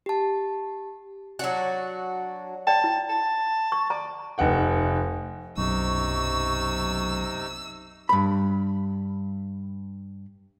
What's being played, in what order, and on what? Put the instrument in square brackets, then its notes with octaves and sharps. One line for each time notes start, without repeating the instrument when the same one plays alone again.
[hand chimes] G4 A5
[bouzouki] F#3 D4 F#4
[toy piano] D5 G5 [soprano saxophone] A5
[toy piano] E4
[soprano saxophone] A5
[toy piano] C#6
[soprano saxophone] D5 [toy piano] A#5
[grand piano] F1 D#4 F#5 G5
[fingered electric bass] B1 F#2 [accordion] C3 D#4 [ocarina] C#6 [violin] E6
[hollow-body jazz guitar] G2 B5